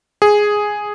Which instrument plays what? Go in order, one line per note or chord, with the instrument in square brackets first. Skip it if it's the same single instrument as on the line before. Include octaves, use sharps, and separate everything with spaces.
[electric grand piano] G#4